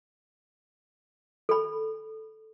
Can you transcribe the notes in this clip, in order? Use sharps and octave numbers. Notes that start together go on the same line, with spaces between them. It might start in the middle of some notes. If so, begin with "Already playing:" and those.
A4 B5